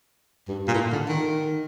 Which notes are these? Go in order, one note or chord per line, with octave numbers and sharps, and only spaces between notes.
G2
A#2
A2
D3
D#3